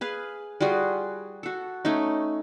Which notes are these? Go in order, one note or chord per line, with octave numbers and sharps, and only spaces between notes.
G#4 B4 F5
G3 F4 F#4 G#4
F#4 A4
A3 C#4 D#4